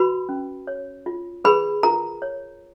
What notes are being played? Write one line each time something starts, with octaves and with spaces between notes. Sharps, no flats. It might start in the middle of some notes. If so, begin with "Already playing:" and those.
Already playing: F#4 B4 B5
C#4
C#5
F4
G#4 B4 B5
F4 A#4 A#5
C#5